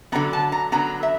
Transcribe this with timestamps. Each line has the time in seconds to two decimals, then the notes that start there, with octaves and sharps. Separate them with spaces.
0.12 D3 F#3 B3 A#5
0.33 A5
0.52 A#5
0.72 D3 F#3 B3 A#5
1.03 E5